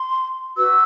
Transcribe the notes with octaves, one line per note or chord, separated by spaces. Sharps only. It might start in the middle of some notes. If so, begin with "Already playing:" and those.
Already playing: C6
F#4 B4 E6